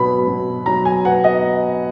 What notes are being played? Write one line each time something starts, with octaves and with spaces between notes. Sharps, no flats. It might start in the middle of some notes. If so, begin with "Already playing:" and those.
Already playing: B2 F#3 B3 B5
B2
F#3 A#5
G#5
B3 F#5
D#5